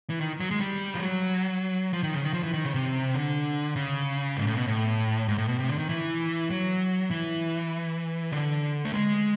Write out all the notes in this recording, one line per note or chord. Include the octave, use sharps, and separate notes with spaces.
E3
D#3
F#3
G#3
G3
F3
F#3
F3
D#3
C#3
D#3
F3
E3
D#3
C#3
C3
D3
C#3
G#2
A2
B2
A2
G#2
A2
B2
C3
D3
D#3
E3
F#3
E3
D3
A3
G#3